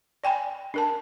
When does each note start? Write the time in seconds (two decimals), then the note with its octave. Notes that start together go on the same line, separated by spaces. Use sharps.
0.24 D5 G5 G#5 B5
0.74 D4 A#4 A5